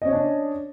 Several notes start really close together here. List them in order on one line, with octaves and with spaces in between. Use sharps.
D#5 C#4 C#5 D4